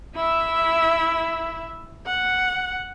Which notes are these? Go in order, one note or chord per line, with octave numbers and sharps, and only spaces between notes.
E4 E5
F#5